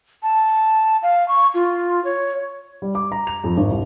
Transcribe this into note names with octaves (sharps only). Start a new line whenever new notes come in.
A5
F5
C#6
F4
C#5
G3
D6
A#5
F7
F2
G#1
C2